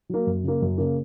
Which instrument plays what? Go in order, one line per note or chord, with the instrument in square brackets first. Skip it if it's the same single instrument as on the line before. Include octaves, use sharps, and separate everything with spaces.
[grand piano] F#3 A#3
F#2
C#3 A#3
F#2
C#3 A#3